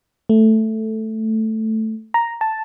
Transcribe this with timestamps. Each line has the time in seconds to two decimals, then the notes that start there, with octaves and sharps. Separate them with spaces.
0.29 A3
2.14 A#5
2.41 A5